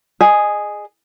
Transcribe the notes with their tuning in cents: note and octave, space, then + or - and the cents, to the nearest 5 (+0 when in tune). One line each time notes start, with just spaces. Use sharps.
G#4 +0 D#5 -25